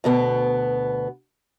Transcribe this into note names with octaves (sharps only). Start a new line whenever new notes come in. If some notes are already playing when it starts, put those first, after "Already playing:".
D2 B2 B3